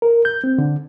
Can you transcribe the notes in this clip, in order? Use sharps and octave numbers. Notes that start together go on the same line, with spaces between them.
A#4
G6
C4
D3